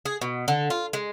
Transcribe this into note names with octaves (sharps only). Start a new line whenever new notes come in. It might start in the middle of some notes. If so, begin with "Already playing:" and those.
G#4
B2
D3
F4
G#3